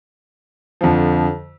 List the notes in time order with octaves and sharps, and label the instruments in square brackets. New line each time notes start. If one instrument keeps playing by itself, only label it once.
[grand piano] F2 D3 F3